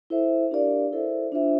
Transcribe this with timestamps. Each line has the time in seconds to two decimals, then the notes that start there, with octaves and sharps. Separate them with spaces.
0.10 E4 A4 C5 E5
0.51 D4 G4 A#4 D5 F5
0.92 E4 A4 C5 E5
1.32 D4 F4 C5 E5